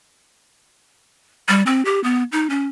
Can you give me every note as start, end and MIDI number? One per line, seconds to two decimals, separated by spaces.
1.48 1.63 55
1.66 1.84 60
1.85 2.02 67
2.04 2.23 59
2.32 2.48 63
2.50 2.68 61